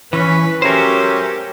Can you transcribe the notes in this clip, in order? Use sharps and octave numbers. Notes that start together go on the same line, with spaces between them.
E3 C#4 B4
F#3 A3 C#4 G4 A#4 C5